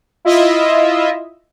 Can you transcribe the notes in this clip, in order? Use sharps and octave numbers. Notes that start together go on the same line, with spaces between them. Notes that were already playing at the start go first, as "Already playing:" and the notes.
E4 F4 D#5 E5